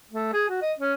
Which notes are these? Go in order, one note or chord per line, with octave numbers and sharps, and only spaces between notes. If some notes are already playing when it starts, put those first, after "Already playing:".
A3
G#4
F#4
D#5
C#4